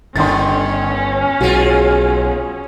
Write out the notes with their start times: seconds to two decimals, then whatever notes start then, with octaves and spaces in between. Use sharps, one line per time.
0.16 G1 D3 D#3 C#4 C6 A6
1.41 B1 G#3 F4 F#4